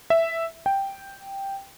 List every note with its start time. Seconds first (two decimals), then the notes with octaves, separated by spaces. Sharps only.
0.10 E5
0.66 G5